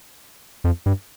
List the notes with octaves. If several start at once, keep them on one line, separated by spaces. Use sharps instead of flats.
F2
G2